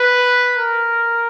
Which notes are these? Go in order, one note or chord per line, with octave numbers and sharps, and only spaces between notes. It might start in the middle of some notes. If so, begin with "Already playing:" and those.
Already playing: B4
A#4